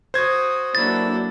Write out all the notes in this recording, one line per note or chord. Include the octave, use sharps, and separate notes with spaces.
F#4 C5 D#6 G#6
F#3 A#3 D4 E4 A4 A6